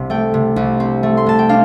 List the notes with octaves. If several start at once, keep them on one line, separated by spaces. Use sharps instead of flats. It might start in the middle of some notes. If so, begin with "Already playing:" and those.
Already playing: C2 C3
A3 G5
C3
C2
C4
A3
C6
C3 A5
G5
D4 F5